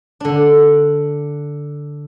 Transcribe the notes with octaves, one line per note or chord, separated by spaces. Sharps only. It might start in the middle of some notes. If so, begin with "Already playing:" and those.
D3 D4